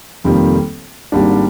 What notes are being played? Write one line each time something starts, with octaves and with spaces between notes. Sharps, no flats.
F1 F2 D#3 G3 A#3
G#1 G#2 G3 A#3 D4